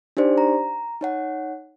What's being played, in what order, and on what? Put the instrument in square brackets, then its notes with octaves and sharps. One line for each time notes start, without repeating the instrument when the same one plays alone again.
[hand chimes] D4 D#4 G4 C5 D5
A#5
D#4 C#5 F#5